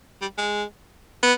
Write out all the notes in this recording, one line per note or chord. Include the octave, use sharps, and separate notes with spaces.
G3
G#3
B3